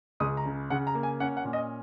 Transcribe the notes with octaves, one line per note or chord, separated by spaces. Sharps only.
C#2 D#6
A#5
C#3
C#3 F#5
A#5
A#3
G#5
C#4 F#5
F#5
A#2
D#5